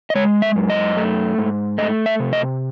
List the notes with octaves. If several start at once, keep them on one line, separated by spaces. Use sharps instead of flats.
D#5
G#3 C#5
E5
F#2
D#5
A3
G#2
A3 D#5
E5
C3
D#5